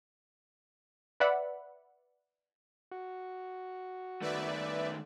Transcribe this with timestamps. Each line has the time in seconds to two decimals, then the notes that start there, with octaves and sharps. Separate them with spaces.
1.20 B4 D5 E5 F#5 B5
2.92 F#4
4.21 D#3 A3 B4 D5 E5